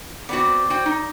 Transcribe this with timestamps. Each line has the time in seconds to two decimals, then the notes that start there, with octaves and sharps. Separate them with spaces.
0.29 B3 C4 F#4 D5
0.70 F#4 C5 G5
0.86 D#4